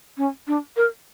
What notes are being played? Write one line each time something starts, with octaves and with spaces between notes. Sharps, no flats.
C#4
D4
A#4